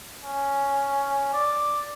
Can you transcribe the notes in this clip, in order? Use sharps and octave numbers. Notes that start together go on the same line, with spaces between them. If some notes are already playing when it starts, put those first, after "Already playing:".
C#4
D5